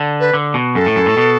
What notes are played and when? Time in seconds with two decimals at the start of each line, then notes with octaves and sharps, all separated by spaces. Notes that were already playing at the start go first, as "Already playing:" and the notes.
Already playing: D3
0.20 B4
0.34 D3
0.54 B2
0.75 F#2 A4
0.86 A2
0.96 F#2
1.06 A2
1.17 B2